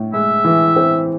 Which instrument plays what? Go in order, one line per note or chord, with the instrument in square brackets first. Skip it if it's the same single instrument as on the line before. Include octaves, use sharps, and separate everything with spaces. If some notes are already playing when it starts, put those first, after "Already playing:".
Already playing: [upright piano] A2
[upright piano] G#3 [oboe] E5
[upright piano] E3
C4